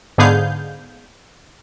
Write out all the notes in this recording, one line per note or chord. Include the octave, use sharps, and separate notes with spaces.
G#2 D3 B3 G#4 F5 G6